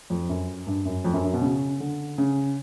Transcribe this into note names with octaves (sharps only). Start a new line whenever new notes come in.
F2
F#2
G2
F#2
F2
F#2
F#2
B2
C#3
D3
C#3